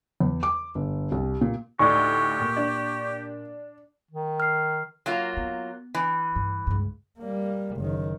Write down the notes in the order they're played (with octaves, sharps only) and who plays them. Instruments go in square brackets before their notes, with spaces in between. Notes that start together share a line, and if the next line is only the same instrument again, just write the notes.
[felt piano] E2
D6
G1
C2
A#2
[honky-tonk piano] D2 A2 [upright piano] D#4 D5 [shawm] G4 [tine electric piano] C#6
[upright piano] A#2
[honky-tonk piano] D4
[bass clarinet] D#3
[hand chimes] F6 C7
[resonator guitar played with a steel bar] F#3 A#3 F4
[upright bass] B3
[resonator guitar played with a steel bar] E3
[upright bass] G2
C#2 G2
[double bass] G3 A#3
F#1 D#3